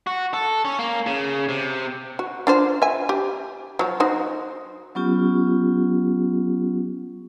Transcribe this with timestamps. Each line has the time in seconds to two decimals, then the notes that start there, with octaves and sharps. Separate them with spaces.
0.07 F#4
0.33 A4
0.65 C#4
0.79 A#3
1.07 C#3
1.49 C3
2.19 F#4
2.47 D4 F4 C5
2.82 E5 G#5
3.09 G4
3.79 F3 F#3
4.00 D#4 F#4 C5
4.95 F#3 B3 C#4 F4 G4